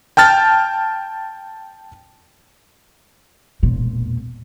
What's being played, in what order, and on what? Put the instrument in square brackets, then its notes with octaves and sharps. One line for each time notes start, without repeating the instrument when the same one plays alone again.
[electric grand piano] G5 A5 F6 A6
[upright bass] E1 A#2